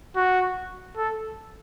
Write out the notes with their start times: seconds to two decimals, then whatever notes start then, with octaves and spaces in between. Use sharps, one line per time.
0.16 F#4
0.97 A4